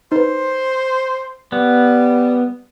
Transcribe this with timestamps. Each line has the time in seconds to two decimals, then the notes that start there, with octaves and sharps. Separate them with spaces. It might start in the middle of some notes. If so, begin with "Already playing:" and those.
0.12 D#4 B4 C5
1.52 G3 B3